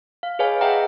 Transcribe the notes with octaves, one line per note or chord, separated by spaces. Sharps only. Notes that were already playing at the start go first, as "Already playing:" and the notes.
F5
G#4 B4 C#5 D#5 F5 G#5
G#4 D#5 E5 F#5 G5 A#5